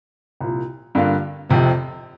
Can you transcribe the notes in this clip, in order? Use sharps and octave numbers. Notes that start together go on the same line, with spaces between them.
C2 A#2 F3
G2 D3 A#3 F4
F1 F2 C3 F3